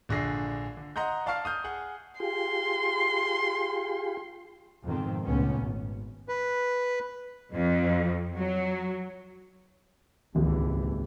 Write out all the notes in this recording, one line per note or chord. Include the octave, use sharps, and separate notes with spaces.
A#1 D3 G#4 A#6 C7
D3
D#5 F#5 A#5 C6 G6
D5 F5 A5 C#6 F6 C7
D#6 F6 G6
G#4 F#5
F4 G4 G#4 C6
F2 G#2 B2 D#3 C4
C#2 A#2 A3 B3 C#4
G#1
B4
F2
F#3
D#1 G#1 C#2 E3 G#3